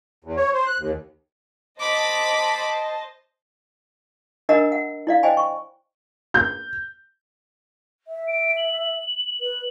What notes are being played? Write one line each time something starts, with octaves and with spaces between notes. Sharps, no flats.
E2
C#5
C5
F#6
D#2
C5 D#5 A5 B5 D6
D4 A#4 D#5 F#5 A#5 E6
F#5
E4 D5 F5
C5 D#5 G5 G#5 B5
C#6
G6
E5
D7
F#7
B4